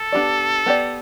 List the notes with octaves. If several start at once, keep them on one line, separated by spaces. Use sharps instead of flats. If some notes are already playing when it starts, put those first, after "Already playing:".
Already playing: A4
B3 D4 G4 D5
B3 G4 D5